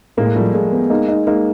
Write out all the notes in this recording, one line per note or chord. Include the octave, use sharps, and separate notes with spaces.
A2 G#3 A#3
F3 G3 A3
F3 G#3 A#3
B3
G#3 A#3 D#4
D#4
G#3 A#3 D#4